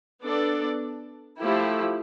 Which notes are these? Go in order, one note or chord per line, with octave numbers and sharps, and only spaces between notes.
B3 D4 A4 D5
F3 A3 E4 G4